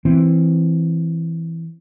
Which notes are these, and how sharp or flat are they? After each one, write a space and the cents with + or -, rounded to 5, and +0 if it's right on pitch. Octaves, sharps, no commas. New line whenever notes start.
E3 +0 C4 +0